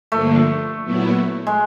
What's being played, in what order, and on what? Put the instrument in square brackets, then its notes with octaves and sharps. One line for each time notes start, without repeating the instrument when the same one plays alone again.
[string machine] G2 D3 F3 A#3 [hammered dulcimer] A3
[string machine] A#2 F#3 B3 E4
[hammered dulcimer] G#3